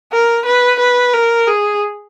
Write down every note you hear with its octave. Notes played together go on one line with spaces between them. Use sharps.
A#4
B4
B4
A#4
G#4